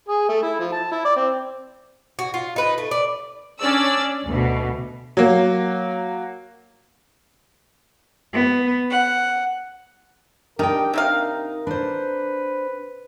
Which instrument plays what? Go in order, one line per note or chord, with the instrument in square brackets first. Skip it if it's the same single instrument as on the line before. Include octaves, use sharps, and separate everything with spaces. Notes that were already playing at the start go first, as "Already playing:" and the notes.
[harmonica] G#4
A3
E4
F3
A5
E4
D5
C4
[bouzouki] F#4
F4
D#4 B4
A3
D5
[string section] C#4 D4 D5 E6
D2 B2
[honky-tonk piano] F#3 A#3
[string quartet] B3
F#5
[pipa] D#3 D#4 [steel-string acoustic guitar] D4 G5 [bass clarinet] G4 [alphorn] A#4
[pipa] C3 D#3 F5 [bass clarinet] D#4
[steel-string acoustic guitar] D4 C5 [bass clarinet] B4